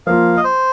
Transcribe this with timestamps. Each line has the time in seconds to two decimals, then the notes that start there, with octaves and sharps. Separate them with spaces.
0.07 F3 A#3 F4 F5
0.37 D#5
0.44 C5